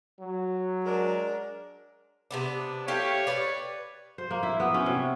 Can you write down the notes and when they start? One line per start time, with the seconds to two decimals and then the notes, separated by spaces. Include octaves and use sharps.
0.20 F#3
0.85 G#3 D4 A#4
2.31 C3 B3 D4
2.88 A3 G4 C#5 F5
3.27 B4 D5
4.18 C5
4.31 A#3
4.43 E4
4.60 B3
4.74 C#4
4.86 C3